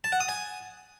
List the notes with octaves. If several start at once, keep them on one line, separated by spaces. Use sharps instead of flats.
A5
F#5
D#6
G#5